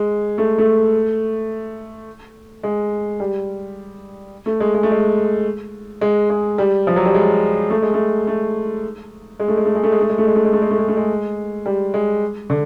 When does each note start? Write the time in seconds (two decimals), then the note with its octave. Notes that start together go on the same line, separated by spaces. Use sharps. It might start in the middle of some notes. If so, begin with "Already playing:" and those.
Already playing: G#3
0.38 A3
0.58 A3
2.63 G#3
3.20 G3
4.46 A3
4.60 G#3
4.74 G#3
4.83 A3
4.92 G#3
6.01 G#3
6.30 G#3
6.58 G3
6.87 F3
6.96 F#3
7.05 G3
7.14 G#3
7.70 A3
7.82 G#3
7.94 A3
8.27 A3
9.40 G#3
9.48 A3
9.57 G#3
9.66 A3
9.75 G#3
9.83 A3
9.92 G#3
10.01 A3
10.10 G#3
10.18 A3
10.27 G#3
10.36 A3
10.45 G#3
10.53 A3
10.62 G#3
10.71 A3
10.79 G#3
10.88 A3
10.97 G#3
11.66 G3
11.94 G#3
12.50 D3